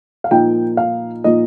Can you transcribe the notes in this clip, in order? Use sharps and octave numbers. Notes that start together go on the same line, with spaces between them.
F5
A#2 F3 A#3 D#4 G5
F5
A#2 F3 A#3 D#4 D#5